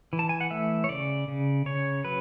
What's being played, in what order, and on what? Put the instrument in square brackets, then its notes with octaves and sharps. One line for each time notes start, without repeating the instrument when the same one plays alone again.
[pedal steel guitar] E3
A5
G#5
F#5
A3 E5
C#5
C#3 D5
C#3
C#3 C#5
F#3 B4